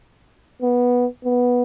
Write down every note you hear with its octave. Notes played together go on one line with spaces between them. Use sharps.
B3
B3